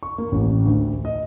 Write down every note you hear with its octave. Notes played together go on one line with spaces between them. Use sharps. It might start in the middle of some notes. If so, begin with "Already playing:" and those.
C#6
A#3
A1
D2
D#5